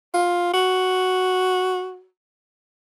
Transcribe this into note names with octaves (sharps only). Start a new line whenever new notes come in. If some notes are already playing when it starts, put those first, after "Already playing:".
F4
F#4